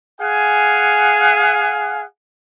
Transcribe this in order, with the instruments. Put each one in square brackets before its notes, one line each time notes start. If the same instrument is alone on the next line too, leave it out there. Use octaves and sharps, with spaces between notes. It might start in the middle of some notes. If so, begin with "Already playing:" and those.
[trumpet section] G#4 F5 F#5 G#5